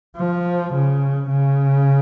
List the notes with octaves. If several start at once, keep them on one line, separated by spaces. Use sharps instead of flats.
F3
C#3
C#3